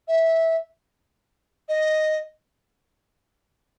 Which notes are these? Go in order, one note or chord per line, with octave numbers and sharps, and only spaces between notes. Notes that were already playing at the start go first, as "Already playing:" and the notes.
E5
D#5